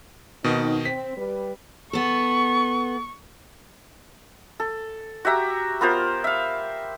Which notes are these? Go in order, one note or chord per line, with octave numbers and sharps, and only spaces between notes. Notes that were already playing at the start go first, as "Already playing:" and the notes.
B2 D#3 B3 C4 D#4 D#5
C4 B6
G3 B4
B3 A4 C#6
A4
F#4 G4 E5 A#5
B3 F4 A#4 C5
E5 F5